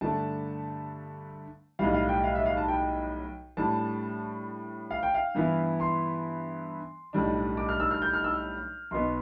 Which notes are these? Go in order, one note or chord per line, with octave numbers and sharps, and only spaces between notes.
G2 D3 A3 D4 A5
B1 A2 G3 F5
F5
G5
F5
E5
F5
A5
G5
A2 G3 D4 A5
F5
G5
F5
G2 E3 B3 E4
C6
B1 A2 G3 D4
D6
F6
E6
F6
G6
F6
E6
B1 B2 B3 C6